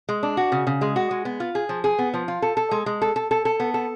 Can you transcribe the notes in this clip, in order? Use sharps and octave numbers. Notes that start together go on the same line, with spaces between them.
G#3
D4
F#4
C#3
C#3
G#3
F#4
G#3
B3
F4
G#4
F3
G#4
B3
F3
F4
A4
A4
G#3
G#3
A4
A4
A4
A4
B3
A4